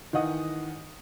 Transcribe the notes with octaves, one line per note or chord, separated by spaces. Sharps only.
D#3 E3 D#5 F#5 D#6